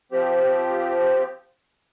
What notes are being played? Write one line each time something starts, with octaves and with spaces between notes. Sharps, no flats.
F3 C4 G4